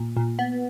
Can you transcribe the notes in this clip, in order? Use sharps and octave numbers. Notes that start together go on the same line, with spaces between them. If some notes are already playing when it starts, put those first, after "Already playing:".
Already playing: A#2
A#2
B3